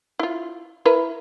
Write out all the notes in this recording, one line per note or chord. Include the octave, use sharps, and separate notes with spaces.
E4 F4
E4 A#4 B4